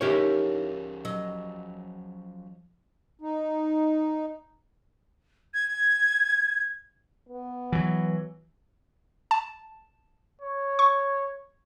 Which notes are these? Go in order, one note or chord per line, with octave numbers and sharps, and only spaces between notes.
F3 C#4 D#4 E4 G4 G#4 A#4 C#5
F#3 D#5
D#4
G#6
B3
E3 F#3
A5
C#5
C#6